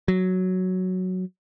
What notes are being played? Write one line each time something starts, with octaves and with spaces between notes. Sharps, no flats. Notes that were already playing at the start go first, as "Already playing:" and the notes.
F#3